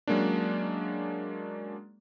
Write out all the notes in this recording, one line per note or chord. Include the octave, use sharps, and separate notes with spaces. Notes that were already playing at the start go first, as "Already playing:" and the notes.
F#3 G#3 A#3 C#4 D4